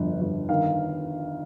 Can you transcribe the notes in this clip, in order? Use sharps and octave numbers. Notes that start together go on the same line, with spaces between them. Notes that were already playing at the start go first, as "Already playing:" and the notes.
Already playing: G1 F2
G1
D#3 F5